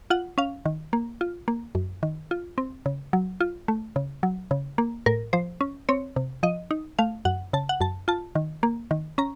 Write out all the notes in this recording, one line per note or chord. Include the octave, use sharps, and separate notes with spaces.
F4 F#5
C#4 F5
D#3
A#3
F4
A#3
F#2
D#3
F4
C4
C#3
F#3
F4
A3
C#3
F#3
C#3
A#3
A2 A#4
F3 C5
C#4
C4 C#5
C3
F3 D#5
D#4
A3 F5
F#2 F#5
C#3 A5
F#5
F#2 A5
F4 A5
D#3
A#3
D#3
C#4 A#5